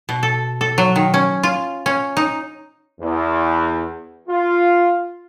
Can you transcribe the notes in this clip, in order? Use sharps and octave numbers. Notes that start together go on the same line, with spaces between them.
B2
A4
A4
F#3
D#3
C#4
F4
C#4
D#4
E2
F4